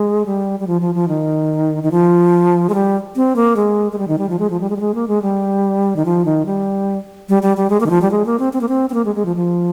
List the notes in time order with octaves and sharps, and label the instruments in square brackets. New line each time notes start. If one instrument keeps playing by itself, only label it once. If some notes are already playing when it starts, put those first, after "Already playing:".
Already playing: [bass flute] G#3
G3
G3
F3
F3
F3
D#3
D#3
F3
G#3
G3
C4
A#3
G#3
G#3
G3
D#3
G3
F3
G#3
F3
G3
G#3
G3
G#3
A#3
G#3
G3
D#3
F3
D#3
G3
G3
G3
G3
G#3
A#3
D#3
F3
G3
G#3
A#3
C4
C4
A#3
C4
C4
A#3
G#3
G#3
F3
F3